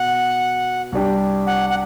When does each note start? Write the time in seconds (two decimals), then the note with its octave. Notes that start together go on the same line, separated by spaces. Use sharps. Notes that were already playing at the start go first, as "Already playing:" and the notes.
Already playing: B2 F#5
0.92 C2 C3 G3 D4 G4
1.47 F#5
1.70 F#5